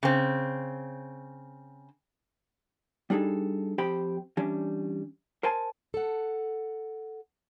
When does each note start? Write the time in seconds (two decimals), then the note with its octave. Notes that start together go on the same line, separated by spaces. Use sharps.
0.03 C#3 C4
3.10 G3 D4 D#4 G#4 A4
3.78 F2 G4 C5 G5 B5
4.37 E3 G3 C#4 D4
5.43 A#4 C5 G#5 A5
5.94 A4 F#5